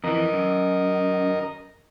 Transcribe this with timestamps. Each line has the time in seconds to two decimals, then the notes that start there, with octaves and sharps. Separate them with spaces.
0.04 F2 E3 A#4 D#5
0.33 F#2